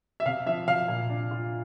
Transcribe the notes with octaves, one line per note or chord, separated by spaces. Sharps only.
E5
C3 F5
F3 E5
C3 F5
A#2
D4
F4